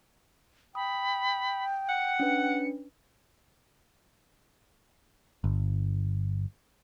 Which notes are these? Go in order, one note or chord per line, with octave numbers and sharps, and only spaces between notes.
G5 B5 D#6
F#5 C#7
C#4 D4 B4
G1